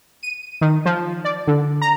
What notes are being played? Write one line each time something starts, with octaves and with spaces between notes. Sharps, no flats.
D#7
D#3
F3
D5
D3
A#5